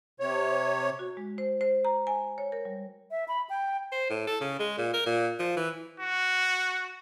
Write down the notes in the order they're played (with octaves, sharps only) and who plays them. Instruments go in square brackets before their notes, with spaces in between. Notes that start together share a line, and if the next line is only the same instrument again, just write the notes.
[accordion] C3 C#5
[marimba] F#4
G#3
C5
C5
A#5
G#5
C#5
A#4
G3
[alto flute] E5
B5
G5
[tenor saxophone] C5
A2
A4
C#3
G#3
A#2
A#4
A#2
F3
E3
[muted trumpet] F#4